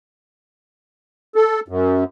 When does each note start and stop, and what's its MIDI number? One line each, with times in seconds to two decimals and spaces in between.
1.35 1.60 69
1.68 2.04 42